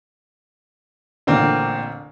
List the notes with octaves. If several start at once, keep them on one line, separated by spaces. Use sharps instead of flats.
A1 A#2 D3 C4 A#4